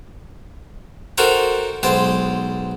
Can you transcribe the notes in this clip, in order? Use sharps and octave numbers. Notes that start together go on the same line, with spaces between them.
D#4 F#4 A4 A#4 C5 G5
B1 G#3 C5 G5 A5